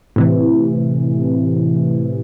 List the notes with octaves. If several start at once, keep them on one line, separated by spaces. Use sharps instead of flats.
A2 C3 E3